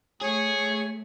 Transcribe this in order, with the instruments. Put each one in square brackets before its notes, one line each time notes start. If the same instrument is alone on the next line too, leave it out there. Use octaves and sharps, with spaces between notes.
[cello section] A3 [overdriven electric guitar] G#4 [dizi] C#5